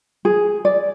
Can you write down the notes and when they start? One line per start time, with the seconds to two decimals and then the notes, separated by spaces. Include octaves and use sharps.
0.25 G#4
0.65 D5